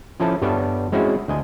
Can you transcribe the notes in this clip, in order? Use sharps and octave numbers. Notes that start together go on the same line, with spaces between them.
F3 C#4 E4 A4 A5
G2 G3 B3 A4 C#5 E5
G#3 C4 C#4 E4 F#4
D2 D#5 G#5